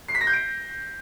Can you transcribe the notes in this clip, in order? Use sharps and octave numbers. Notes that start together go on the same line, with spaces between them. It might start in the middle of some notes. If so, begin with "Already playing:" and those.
C7
B6
A#6
G6
D7